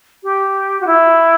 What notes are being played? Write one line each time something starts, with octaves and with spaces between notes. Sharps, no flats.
G4
F#4
E4